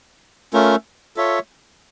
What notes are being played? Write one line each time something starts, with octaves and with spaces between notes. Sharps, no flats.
A3 C#4 F4 A#4
F4 A4 C#5 E5